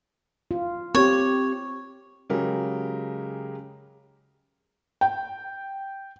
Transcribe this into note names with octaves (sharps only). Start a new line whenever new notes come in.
F4
C4 G4 C#5
C#3 F#3 G#3 G4 A#4
G5